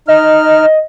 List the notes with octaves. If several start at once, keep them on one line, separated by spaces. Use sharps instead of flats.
D#4 D#5 F6